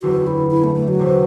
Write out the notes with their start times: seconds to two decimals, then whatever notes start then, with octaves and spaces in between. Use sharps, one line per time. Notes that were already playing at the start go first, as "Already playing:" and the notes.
0.02 F#1 E2 D3 F#4
0.27 E4
0.50 E4
0.64 A3
0.75 A3
0.88 F#3
0.99 E1 E2 C3